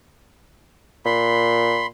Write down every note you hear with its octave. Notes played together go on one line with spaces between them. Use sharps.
A#2 B5 C6